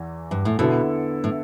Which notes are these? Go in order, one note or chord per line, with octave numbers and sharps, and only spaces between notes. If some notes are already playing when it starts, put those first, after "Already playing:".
Already playing: E2 E3
G2
A2
B2 D3 B3 E4 A4
A2